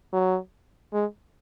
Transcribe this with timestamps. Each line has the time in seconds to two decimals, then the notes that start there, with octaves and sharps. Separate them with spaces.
0.13 F#3
0.93 G#3